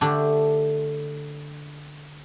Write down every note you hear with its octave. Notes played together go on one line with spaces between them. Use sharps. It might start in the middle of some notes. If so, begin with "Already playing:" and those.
D3 A3 D4 G4